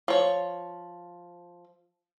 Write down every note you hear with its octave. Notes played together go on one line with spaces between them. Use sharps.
F3 C#5